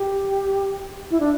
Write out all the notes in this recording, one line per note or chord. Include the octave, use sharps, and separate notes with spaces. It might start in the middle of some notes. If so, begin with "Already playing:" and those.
Already playing: G4
E4
D4